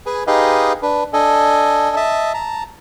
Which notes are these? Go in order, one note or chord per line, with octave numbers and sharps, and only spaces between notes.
G#4 B4 G#5
D#4 G4 G#4 B4 D#5 F5
D4 B4
D4 A4 D#5 G#5
D#5 E5 A5
A5 A#5